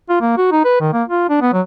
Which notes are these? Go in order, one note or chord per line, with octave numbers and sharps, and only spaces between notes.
F4
A#3
F#4
D#4
B4
D#3
A#3
F4
D4
B3
F#3